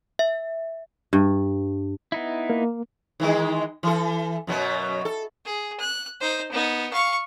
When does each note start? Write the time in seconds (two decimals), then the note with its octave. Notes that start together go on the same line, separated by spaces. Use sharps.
0.19 E5
1.13 G2
2.12 B3 D#4 E4
2.50 A#3
3.20 D#3 E3 G#3
3.83 E3 A4
4.47 F#2 B2 F#3
5.05 A4
5.45 G#4
5.80 F#6
6.21 D#4 C5
6.51 B3 D#4
6.93 F5 C#6